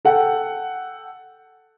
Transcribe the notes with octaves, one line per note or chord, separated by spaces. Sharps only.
A4 F#5 G5